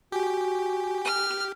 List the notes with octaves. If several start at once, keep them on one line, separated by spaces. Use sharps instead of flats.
F#4 G4 G#5
F6